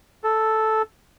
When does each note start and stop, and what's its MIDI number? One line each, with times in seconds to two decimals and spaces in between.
0.24 0.82 69